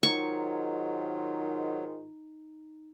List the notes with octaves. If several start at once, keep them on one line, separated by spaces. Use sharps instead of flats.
G#2 D#3 F#3 D#4 F4 C#6